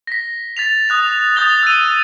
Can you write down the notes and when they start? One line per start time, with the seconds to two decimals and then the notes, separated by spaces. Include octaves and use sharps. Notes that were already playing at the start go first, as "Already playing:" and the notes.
0.07 A#6 B6
0.57 A6 B6 F7
0.89 D#6 F#6 F7
1.36 D#6 G6 A6 G7
1.63 E6 D#7